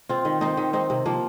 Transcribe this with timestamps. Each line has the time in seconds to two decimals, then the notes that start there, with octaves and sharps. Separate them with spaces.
0.09 C4 F4
0.25 D#3
0.41 C4 D#4 C5
0.57 D#3
0.73 C4 D#4 C5
0.90 C3
1.06 F3 A#3